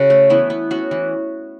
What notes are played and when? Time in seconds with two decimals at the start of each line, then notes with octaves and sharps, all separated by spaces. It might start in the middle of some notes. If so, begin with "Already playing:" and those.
Already playing: C#3 C#4 F#4 A4
0.10 A3
0.30 E3 B3 E4
0.50 B3
0.71 B3 C#4 F#4
0.91 E3